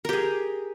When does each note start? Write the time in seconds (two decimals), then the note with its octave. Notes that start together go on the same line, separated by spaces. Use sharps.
0.05 A#4
0.09 G4
0.13 G#4